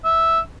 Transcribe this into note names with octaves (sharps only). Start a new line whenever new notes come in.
E5